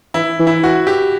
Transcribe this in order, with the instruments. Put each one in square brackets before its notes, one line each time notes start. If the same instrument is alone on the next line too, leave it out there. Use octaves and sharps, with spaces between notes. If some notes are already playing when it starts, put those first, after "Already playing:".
[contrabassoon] E3 [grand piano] E4
[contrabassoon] E3
[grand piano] E4
F#4
G4